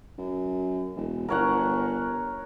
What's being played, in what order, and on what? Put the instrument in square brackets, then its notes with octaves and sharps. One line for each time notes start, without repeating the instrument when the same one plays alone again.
[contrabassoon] F#2
E1
[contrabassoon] G1 [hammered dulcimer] A#4 C#5 F#5